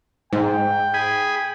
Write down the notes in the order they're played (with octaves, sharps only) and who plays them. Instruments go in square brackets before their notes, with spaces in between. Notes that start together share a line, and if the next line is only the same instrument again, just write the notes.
[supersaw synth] G#2 [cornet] G5
[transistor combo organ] G#4 G#5 B5